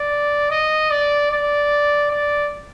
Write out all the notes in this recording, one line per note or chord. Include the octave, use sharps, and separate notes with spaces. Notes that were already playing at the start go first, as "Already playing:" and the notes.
Already playing: D5
D#5
D5
D5
D5